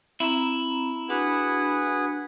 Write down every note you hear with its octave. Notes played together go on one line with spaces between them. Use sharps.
C4 E4 A#5 B5
D4 F#4 G#4 B4 F#5 B5